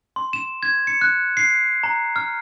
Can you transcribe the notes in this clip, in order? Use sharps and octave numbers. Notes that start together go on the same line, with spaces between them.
C6
E7
G#6
C#7
F#6
C7
A#5
F6